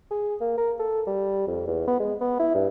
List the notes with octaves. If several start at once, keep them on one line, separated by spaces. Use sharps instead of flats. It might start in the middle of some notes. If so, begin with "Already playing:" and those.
G#4
A#3
A#4
A4
G3
F2
E2
B3
G#3
B3
E4
G2